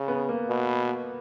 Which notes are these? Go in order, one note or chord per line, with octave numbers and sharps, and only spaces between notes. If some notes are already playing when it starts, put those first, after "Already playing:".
Already playing: C#3
B3
A#3
B2